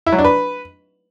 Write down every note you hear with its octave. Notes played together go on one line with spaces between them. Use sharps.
E4
F#3
D4
B4